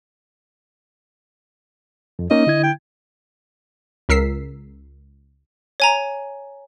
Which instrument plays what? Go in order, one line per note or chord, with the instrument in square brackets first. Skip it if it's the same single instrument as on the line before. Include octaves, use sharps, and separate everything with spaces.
[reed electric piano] F2
[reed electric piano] A#3 C#4 D#4 [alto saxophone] D#5
[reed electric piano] D3 E4 G#6
[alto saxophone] G5
[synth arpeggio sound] C#2 A#4 E6 B6 C7
[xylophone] C#5 G#5 A#5